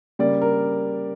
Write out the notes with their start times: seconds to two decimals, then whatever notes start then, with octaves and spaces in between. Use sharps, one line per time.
0.19 C#3 G3 A#3 D5
0.42 A#4